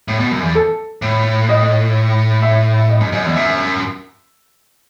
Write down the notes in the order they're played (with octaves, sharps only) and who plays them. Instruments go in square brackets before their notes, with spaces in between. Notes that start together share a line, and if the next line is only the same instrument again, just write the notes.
[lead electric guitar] A2
B2
F#2
E2
[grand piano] A4
[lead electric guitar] A2
[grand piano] D#5
E5
E5
D#5
[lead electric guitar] F#2
[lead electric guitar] F#2 [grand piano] D#5
[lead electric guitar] E2
[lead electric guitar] F#2 [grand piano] E5